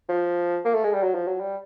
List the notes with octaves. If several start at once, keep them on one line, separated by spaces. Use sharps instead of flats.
F3
A#3
A3
G#3
G3
F#3
F3
F#3
G3